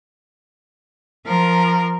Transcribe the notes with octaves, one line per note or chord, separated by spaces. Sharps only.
F3 A#4